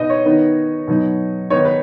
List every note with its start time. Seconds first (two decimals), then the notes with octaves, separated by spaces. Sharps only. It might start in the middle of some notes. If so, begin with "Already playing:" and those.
Already playing: B2 B3 D#4 D#5
0.10 C#5
0.25 D#3 B3 D#4
0.87 B2 F#3 D#4
1.50 D#3 B3 D#4 C#5
1.65 B4